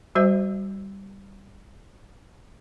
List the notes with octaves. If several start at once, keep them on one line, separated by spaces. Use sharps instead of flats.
G3 F#4 C5 E5